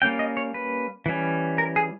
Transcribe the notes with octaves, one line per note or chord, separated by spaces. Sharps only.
G3 A#3 C#4 G5
D#5
C#5
B4
E3 G3 C#4
A#4
G#4